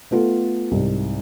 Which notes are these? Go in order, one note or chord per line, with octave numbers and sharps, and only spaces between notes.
A3 B3 F4 A4
C2 G#2